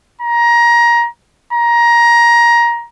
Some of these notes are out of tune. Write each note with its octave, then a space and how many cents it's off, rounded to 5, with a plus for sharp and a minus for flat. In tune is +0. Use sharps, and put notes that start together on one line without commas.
A#5 +20
A#5 +15